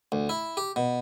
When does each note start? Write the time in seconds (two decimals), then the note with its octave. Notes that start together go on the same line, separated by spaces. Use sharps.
0.12 D2
0.29 E4
0.57 G4
0.76 B2